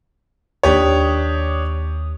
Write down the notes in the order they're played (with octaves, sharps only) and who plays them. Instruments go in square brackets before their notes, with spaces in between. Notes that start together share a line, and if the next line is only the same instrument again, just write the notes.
[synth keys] D#2 D#6 [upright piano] D4 G4 C#5